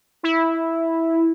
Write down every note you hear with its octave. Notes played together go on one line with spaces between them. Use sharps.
E4